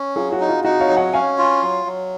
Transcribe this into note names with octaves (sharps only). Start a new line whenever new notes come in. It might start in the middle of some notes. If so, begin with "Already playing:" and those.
Already playing: C#4
F#3 F4 G#4
F#4
D#4
F4
D#4 F#4
C#5 F5
F#3
D#5 F#5
C#4 F5 G#5
F4
F#3
F#3